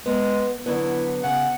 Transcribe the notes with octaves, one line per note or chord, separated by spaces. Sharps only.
G#3 B3
D3 F#3 B3 E4
C#3 F#5